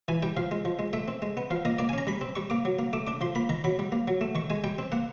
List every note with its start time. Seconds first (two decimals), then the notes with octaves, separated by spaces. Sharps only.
0.08 E3 G#5
0.23 G3 G5
0.37 F3 F5
0.51 G#3
0.65 F3
0.79 G#3
0.93 A3 E5
1.08 C4
1.22 G#3
1.37 B3
1.50 F3 F5
1.65 A#3 D#5
1.78 A#3 D5
1.89 G#5
1.93 C#4 A#5
2.07 G3 B5
2.21 C4
2.36 G3 C#6
2.50 A#3 D6
2.65 F#3
2.79 A#3
2.93 A3 D6
3.07 D4 D6
3.21 F3 C6
3.35 A#3 B5
3.49 D#3 A#5
3.64 F#3 B5
3.79 G3
3.92 A#3
4.08 F#3
4.21 A3
4.35 D#3 C#6
4.50 G#3 G#5
4.64 G3 G5
4.79 C4
4.92 A#3 F#5